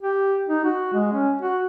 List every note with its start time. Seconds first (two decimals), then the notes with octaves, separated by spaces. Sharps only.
0.02 G4
0.49 D#4
0.65 F#4
0.94 G#3
1.13 C#4
1.42 F#4